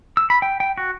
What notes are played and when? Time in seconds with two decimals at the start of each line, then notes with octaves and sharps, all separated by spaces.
0.17 E6
0.30 B5
0.42 G5
0.60 G5
0.78 F#4